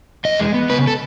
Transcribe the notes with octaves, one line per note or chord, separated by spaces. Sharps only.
E2 D#5
G#3
B3
C#3 B4
A4